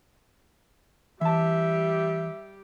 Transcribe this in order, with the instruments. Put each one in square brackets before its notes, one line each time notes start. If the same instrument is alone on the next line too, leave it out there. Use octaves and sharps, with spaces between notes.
[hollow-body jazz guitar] E3 A5 [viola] G3 G4 [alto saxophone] E5